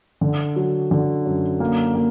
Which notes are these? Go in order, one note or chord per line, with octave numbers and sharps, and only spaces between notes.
D3
F#3
D3
F#2
A#3
A#3